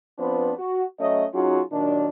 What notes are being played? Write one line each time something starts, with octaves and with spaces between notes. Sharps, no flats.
F3 B3 C4 D4 B4
F#4
F#3 A3 C#4 D#5
F#3 C#4 D#4 F4 F#4 G#4
A#2 D#3 F#3 D4